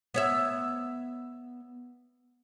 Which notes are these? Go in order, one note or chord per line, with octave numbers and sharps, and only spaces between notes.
B3 C#5 E5